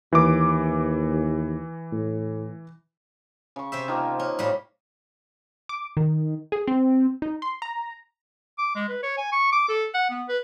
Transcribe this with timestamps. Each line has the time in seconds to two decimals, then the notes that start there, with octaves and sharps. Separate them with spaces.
0.13 D#2 E3 D6
1.92 A2
3.56 C#3 C#6
3.72 C3 C5 E5
3.88 D#3 F3 A#3
4.19 C#4
4.39 A2 G3
5.69 D6
5.97 D#3
6.52 G#4
6.68 C4
7.22 D#4
7.42 C6
7.62 A#5
8.58 D6
8.75 G#3
8.89 B4
9.03 C#5
9.17 G#5
9.32 C#6
9.52 D6
9.69 A4
9.94 F#5
10.10 B3
10.28 B4